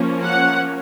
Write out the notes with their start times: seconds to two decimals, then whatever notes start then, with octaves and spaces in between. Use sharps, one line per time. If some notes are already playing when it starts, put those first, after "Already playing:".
Already playing: F3 A#3 C#4
0.23 F#5